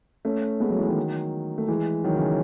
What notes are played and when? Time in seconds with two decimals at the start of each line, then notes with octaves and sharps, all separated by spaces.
0.25 A3 C#4
0.60 G#3 B3
0.69 F#3 A3
0.79 E3 G#3
0.87 D#3 F#3
1.58 A3
1.68 E3 G#3
2.04 D#3 F#3
2.16 C#3 E3